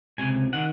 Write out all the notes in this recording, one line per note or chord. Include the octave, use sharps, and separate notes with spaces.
C#2 C3 G#5
D#3 F#5